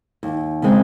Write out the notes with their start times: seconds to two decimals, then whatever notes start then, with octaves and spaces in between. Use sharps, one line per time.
0.23 D#2
0.62 C#3 G#3 C4